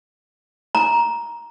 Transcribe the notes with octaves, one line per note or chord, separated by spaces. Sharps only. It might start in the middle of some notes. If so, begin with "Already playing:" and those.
A#5